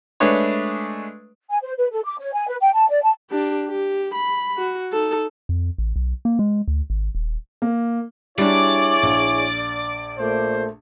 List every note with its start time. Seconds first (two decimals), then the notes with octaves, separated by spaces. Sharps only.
0.20 G#3 A3 D4 B4 C#5
1.50 G#5
1.63 C5
1.78 B4
1.92 A4
2.05 D6
2.19 C#5
2.33 G#5
2.48 B4
2.61 G5
2.74 A5
2.89 D5
3.03 A5
3.30 D4 G4
3.68 G4
4.14 B5
4.58 F#4
4.92 D#4 A4
5.49 F2
5.78 A1
5.96 B1
6.25 A#3
6.39 G#3
6.68 D2
6.90 G#1
7.15 D#1
7.62 A#3
8.38 G3 D4 E4 G#4 C#5 D5
9.03 A#1
10.18 A#2 A3 C5